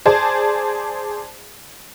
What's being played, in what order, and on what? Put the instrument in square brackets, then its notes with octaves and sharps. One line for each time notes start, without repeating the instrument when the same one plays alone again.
[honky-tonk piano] G#4 C5 D5 A5